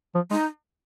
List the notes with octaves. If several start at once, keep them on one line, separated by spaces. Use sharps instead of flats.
F3
G#3 D#4